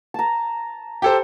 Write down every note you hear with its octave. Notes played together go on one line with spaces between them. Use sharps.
A5 A#5
G4 A4 C5